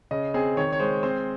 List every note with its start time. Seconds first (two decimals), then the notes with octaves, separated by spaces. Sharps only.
0.11 C#3 D#5
0.34 C4 G#4
0.57 D#3 C#5
0.73 C#5
0.80 G#3 C5
1.03 C4 C5